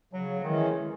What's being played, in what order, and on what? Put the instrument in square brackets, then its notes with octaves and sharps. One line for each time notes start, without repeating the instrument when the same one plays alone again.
[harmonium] C#3 [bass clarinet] F#3
[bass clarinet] D#3 [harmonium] E3 G#3 C#4